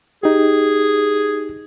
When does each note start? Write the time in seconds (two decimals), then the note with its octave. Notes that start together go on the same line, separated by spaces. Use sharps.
0.23 D#4 G4 G#4